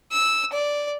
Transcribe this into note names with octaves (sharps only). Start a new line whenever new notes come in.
E6
D5